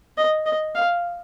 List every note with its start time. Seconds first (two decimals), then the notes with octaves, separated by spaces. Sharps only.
0.18 D#5
0.46 D#5
0.75 F5